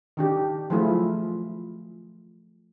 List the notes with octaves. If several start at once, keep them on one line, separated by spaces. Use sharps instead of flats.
D#3 D4 G4
F3 F#3 A3 E4 F4 G#4